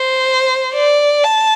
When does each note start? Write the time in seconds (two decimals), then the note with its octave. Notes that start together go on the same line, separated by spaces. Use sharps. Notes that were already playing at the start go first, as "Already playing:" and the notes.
Already playing: C5
0.74 D5
1.24 A5